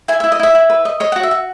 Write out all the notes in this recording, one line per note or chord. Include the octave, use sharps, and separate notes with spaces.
E4 G#5
E4 E5
D#5
E4 E5
E4
B4
D#5
C#5 D#5
F#4 F#5
E5
F#4